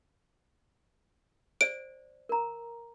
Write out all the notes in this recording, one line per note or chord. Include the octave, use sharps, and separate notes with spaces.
C5 D5 D7
A#4 A#5